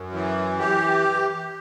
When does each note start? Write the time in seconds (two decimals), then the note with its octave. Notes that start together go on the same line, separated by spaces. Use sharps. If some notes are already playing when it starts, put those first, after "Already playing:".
Already playing: F#2
0.13 E3
0.59 G4